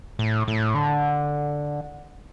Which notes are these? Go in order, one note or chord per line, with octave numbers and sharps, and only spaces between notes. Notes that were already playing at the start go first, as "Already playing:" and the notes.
A2
A2
D3